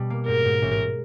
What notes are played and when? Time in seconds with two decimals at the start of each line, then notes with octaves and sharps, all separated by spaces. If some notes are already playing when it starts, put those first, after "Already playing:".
Already playing: B2 G3
0.10 A#3
0.27 G#2 A#4
0.45 G#2
0.62 A1